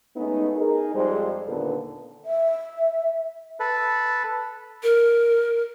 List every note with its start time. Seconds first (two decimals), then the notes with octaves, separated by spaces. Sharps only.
0.16 G#3 A3 B3 C#4 D#4
0.55 D#4 G#4 A#4
0.94 F2 G3 G#3 C5
1.47 D#2 A#2 D3 B3 A4 B4
2.25 E5
3.60 A4 B4
4.83 A#4